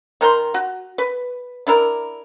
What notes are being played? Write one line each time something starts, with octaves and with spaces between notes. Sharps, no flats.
D#3 A#4 C6
F#4
B4
D4 E4 A#4